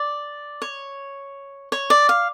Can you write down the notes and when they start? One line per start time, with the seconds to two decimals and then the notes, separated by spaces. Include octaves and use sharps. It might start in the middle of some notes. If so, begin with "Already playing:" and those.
Already playing: D5
0.62 C#5
1.72 C#5
1.90 D5
2.09 F5